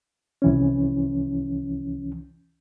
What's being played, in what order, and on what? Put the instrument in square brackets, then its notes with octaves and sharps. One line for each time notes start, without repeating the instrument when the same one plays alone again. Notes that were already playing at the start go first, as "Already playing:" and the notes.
[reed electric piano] C2 E3 C#4